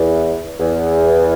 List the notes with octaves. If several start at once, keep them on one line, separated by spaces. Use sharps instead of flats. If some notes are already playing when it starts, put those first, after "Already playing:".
Already playing: E2
E2